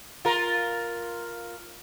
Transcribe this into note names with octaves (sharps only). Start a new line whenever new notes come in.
F4 A#4